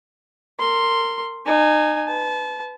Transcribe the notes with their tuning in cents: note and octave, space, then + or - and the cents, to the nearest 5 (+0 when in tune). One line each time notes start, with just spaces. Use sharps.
A#4 -25 C6 +0
D#4 -30 G#5 +0
B4 +20 A5 -30